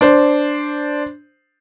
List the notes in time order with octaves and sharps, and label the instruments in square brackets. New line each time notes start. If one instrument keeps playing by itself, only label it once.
[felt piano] D4 C5